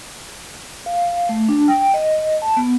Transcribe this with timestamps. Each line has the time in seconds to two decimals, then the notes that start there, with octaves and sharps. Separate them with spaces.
0.86 F5
1.29 A3
1.48 D4
1.68 G5
1.94 D#5
2.42 A5
2.57 B3